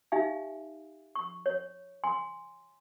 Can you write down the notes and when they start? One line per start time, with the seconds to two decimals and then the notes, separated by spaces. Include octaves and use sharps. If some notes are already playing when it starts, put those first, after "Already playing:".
0.12 D#4 G4 E5 F5 G#5
1.15 C#6
1.46 C#5
2.04 G#5 C6